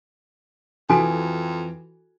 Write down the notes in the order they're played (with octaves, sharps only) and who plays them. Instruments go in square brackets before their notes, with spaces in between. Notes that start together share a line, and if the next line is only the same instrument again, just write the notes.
[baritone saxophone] F2 [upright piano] E3 [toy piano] F#4 A4 G#5